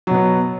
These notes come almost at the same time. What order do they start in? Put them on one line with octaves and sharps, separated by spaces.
F#3 B2 B3